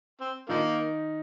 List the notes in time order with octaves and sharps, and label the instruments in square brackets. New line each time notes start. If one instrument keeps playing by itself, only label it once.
[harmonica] C4
[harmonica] D3 F3 A#3 [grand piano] D#3 D#4